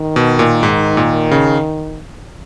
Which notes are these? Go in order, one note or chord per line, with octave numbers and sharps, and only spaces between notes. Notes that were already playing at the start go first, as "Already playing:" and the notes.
Already playing: D#3
B2
A#2
G#2
A#2
C#3